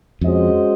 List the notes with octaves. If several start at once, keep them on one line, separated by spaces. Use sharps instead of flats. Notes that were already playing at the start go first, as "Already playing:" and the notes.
F2 G#3 C#4 F#4 C5 D#5